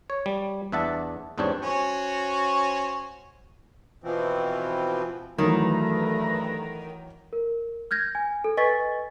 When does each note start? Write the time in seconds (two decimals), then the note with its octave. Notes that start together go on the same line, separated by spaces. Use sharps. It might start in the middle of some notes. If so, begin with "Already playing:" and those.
0.10 C#5
0.26 G3
0.72 E2 D4 E5 F#5 A5
1.38 E2 G#2 C4 D4 G4 C#5
1.63 C#4 F#4 C5
4.04 B2 E3 F3 C4
5.38 G2 D#3 E3 F#3 A3 B4 A#5
7.33 A#4
7.91 F6 G6 G#6 A#6
8.15 G#5
8.44 A4
8.57 B4 D#5 G#5 C#6 A6 B6